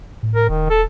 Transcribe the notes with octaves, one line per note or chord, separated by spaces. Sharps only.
A2
A#4
D#1 D#3
A4